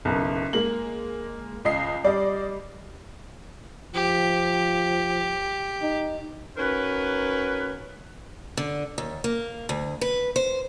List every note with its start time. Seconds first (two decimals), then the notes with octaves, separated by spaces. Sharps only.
0.05 F#1 B1
0.53 G#3 A#3 F#7
1.65 C#2 D#5 C7
2.05 G3 D5 D#5
3.94 F3 G4
5.82 D#4
6.57 C#4 D#4 F#4 A#4 B4
8.57 D3
8.98 D#2
9.24 A#3
9.69 D2
10.01 B4
10.36 C5